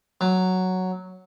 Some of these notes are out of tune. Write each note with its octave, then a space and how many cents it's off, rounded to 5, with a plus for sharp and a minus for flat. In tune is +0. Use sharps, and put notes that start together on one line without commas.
F#3 +0